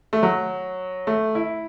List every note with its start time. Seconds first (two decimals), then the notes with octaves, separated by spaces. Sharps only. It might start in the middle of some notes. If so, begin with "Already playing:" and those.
0.13 A3
0.23 F#3
1.07 A3
1.35 E4